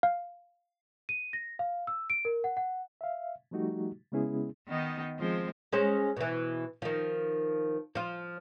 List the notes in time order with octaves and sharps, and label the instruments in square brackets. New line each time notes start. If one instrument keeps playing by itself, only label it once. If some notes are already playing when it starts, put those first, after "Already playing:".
[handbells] F5
[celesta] D#7
A#6
F5
E6
D7
A#4
F#5
F#5
[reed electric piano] E5 F5
F3 G3 A3 D#4 F#4 G4
C#3 G#3 B3 C#4 E4 G#4
[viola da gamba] D#3 B3 D#4
F3 G#3 C4
[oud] G#3 C#4 C5
B2 E3
D#3 F3
F3 F4